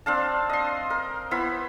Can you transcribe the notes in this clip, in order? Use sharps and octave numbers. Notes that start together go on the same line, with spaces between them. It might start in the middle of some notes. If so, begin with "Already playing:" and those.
C4 D4 F5 A5
D#5 C6
A#4
B3 E4 C5 B5